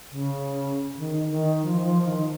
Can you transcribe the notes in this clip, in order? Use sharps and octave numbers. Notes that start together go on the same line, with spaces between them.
C#3
D#3
D#3
F3
F3
D#3